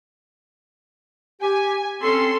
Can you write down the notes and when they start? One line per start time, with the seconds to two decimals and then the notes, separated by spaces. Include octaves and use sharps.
1.42 G4 G#5
2.02 C4 C#4 A4 C6